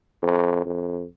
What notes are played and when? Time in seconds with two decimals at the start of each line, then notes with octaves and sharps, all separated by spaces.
0.22 F2
0.65 F2